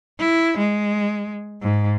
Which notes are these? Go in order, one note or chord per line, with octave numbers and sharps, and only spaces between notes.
E4
G#3
G#2